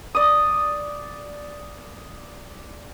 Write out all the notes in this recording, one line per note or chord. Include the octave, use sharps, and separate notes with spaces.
D5 D#6